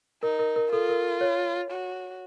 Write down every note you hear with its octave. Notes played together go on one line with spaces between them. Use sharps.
D#4 A#4
A#4
A#4
F4 A4
A#4
C#5
F#4